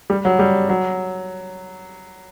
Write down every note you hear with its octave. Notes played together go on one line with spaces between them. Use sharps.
G3
F#3
G3
F#3